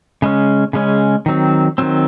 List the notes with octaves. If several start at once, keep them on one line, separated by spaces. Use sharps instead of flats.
C#3 G#3 C#4
C#3 G#3 C#4
D#3 F#3 C4
D#3 F#3 C4